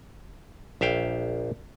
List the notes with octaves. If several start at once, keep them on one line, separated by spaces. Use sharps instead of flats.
A#1 E5 F5 G5